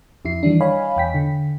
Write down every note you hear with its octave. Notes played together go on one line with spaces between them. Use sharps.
F2 E4 C7
D#3 E3 G3 D4
C#5 D#5 F5 G#5 B5
E2 G5 B6
D3